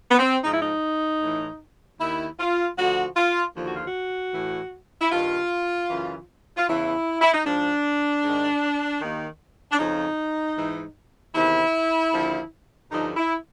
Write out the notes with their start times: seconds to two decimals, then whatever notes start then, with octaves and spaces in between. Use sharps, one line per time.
0.11 B3
0.19 C4
0.44 G#2 F3 D#4
0.52 E4
0.60 D#4
1.22 A2 E3
1.99 D#2 D#3 E4
2.39 F4
2.77 D2 D3 F3 F#4
3.16 F4
3.56 D#2 D3 F3
3.66 F#4
3.75 F4
3.86 F#4
4.34 A2 E3
5.00 E4
5.11 G2 D#3 F4
5.89 F#2 C#3 E3
6.57 F4
6.68 E2 C#3 E3 E4
7.21 E4
7.34 D#4
7.45 G#2 F3 D4
8.23 G#2 D#3
9.00 D#2 D#3
9.72 D4
9.78 F2 C#3 F3 D#4
10.56 G#2 E3
11.34 E2 C3 D#3 E4
12.13 D#2 D3 F3
12.90 G2 D3 F3 D#4
13.16 E4